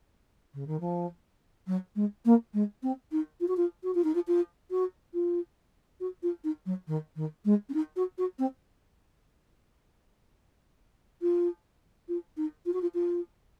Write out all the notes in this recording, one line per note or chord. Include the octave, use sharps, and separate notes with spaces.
C#3
D#3
F3
F#3
G#3
A#3
G#3
C4
D#4
F4
F#4
F4
F#4
F4
D#4
F4
F4
F#4
F4
F#4
F4
D#4
F#3
D#3
D#3
G#3
C#4
D#4
F#4
F#4
C4
F4
F4
D#4
F4
F#4
F4
F4